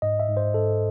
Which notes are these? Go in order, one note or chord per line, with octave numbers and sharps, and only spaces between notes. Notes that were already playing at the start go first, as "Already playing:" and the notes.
G#2 D#5
E5
G#2
C5
G#2 A4